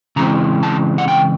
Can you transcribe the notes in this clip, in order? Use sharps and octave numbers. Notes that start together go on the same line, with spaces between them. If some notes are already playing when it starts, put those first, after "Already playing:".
C#3 E3 G#3 C4 A#5
A5
F#5
G5